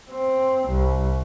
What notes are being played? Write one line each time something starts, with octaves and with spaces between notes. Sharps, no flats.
C4
C2